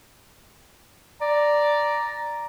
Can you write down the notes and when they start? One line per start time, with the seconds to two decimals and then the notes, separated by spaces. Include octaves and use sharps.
1.21 D5 A#5